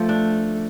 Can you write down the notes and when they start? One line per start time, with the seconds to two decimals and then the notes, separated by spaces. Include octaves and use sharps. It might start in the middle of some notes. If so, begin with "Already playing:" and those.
Already playing: F3 A3
0.09 D4